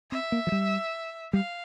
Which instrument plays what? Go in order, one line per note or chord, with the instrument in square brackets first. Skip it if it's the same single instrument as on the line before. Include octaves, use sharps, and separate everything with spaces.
[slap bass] C4 [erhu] E5
[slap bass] A#3
F3
G3
[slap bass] G3 [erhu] F5